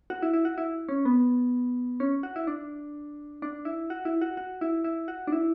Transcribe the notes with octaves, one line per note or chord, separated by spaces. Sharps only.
F#4
E4
E4
F#4
E4
C#4
B3
C#4
F#4
E4
D4
D4
E4
F#4
E4
F#4
F#4
E4
E4
F#4
D4
E4